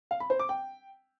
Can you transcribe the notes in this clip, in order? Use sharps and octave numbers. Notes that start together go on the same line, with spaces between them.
F5
B5
C5
D6
G5